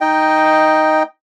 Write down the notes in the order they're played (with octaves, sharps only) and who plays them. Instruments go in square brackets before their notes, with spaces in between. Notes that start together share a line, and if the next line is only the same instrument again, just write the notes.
[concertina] D#4 D#5 G5